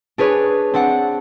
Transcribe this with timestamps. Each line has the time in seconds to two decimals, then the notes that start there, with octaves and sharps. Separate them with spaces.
0.18 D4 G#4 B4 C#5
0.74 C4 D4 D5 F#5